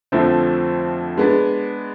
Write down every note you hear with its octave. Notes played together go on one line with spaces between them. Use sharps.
F2 D3 F3 A3 C4
G#3 B3 D4